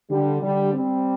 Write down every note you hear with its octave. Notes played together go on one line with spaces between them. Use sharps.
D3 G3
D3 G3
G3 C4